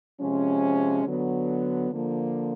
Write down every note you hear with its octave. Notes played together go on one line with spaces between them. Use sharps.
C3 F3 G#3 C#4
D3 F#3 B3
D3 F3 A#3